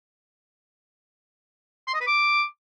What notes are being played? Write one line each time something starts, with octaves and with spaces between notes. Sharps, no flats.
C6
D#5
B4
D6